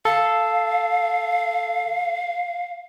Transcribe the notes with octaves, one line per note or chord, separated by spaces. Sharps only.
A4 F5